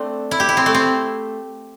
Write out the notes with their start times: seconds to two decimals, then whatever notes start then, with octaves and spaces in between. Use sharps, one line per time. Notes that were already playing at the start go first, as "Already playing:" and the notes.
Already playing: A3 C4 D4
0.31 E4
0.40 G4
0.49 E4
0.57 C4
0.66 A3
0.74 C4